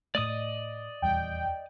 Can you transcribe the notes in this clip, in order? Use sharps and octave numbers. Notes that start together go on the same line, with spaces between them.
A2 A3 D5 D#5 D#6
D#1 E2 G3 G5